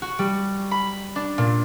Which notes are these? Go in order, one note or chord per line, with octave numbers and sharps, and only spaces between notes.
F#4
G3
B5
D4
A#2